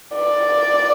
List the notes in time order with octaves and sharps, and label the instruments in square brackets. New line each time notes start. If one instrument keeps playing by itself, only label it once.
[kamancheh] D5